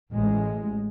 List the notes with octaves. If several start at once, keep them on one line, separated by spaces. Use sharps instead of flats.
A1 G#3